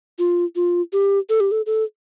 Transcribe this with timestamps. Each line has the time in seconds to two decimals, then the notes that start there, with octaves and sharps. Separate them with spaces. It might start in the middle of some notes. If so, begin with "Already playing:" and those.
0.19 F4
0.56 F4
0.93 G4
1.30 A4
1.40 G4
1.51 A4
1.66 A4